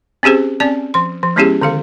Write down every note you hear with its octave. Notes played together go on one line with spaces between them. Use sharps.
C4 C#4 G4 G#4 C5
C4 C#4 D5 G#5 A5
F3 C6
F3
G#3 B3 C#4 E4 G4 G#4
D3 D#3 A4 F5